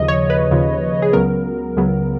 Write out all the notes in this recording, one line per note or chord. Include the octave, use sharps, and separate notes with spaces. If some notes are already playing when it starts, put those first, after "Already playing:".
Already playing: D#2 C#3 F3 D#5
C#5
B4
D#2 C#3 F3
G#4
C#2 C#3 F#3 B3 A#4
C#2 C#3 F#3 B3